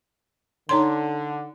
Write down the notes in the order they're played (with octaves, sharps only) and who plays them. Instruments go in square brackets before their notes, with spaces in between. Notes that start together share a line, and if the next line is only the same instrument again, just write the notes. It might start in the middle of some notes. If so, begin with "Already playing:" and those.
[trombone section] D3 [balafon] D#4 C#5 C6